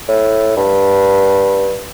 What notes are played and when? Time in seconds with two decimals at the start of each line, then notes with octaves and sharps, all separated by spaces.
0.08 A2
0.57 G2